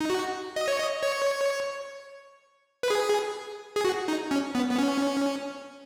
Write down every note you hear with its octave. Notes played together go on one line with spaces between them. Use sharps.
D#4
F#4
D#5
C#5
D#5
C#5
B4
G#4
G#4
F#4
D#4
C#4
B3
B3
C#4